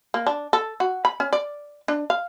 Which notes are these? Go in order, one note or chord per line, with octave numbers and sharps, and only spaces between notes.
A#3
D4
A4
F#4
B5
C#4
D5
D4
F5